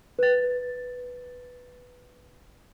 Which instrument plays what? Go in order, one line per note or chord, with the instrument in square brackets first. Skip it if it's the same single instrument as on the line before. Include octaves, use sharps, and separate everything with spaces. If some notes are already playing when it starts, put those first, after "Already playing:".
[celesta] B4 A6